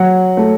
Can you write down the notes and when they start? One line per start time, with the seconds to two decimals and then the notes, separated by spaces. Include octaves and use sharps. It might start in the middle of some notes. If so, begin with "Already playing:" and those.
Already playing: F#3 F#5
0.37 A3